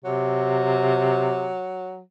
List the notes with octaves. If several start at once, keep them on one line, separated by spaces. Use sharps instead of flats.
C3 F#3